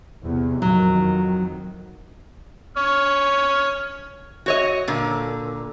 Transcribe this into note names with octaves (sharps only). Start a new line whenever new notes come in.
E2 C3
F2 D#3 F#3
C#5 F6
F#4 C#5 D#5
A#2 D3